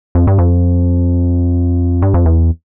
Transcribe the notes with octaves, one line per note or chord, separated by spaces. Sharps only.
F2
G2
F2
G2
F2
E2